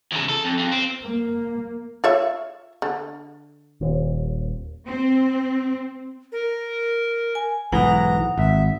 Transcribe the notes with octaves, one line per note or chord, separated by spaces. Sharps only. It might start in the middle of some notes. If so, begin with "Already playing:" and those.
E2 C#3
A4
F2
F2
C4
A#3
F4 C#5 E5
D3
D#1 D#2
C4
A#4
G#5
B1 G#2 E3 F#5 A#5 D#6
G#1 E5